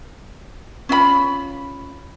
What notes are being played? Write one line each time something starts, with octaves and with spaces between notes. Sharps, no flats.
C#4 F4 D#5 B5